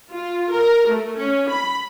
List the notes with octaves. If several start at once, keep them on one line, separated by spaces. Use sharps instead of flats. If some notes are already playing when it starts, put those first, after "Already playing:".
F4
A#4
A3
C#4
B5